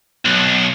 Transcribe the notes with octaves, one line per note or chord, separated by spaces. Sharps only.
B1